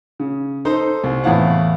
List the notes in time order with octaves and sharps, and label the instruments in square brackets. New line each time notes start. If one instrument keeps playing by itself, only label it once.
[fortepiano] C#3
D#4 A4 C5
C2
E2 A2 F5 F#5